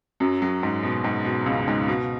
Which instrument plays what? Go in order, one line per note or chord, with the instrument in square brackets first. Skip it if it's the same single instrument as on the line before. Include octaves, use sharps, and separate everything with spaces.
[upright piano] F#2 F#3
F#2 F#3
G#2
B2
G#2
B2
C#2 C#3
G#2
B2